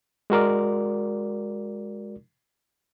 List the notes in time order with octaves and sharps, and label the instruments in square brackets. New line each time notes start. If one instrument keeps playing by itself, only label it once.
[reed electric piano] G#3 F#4 A#4 D5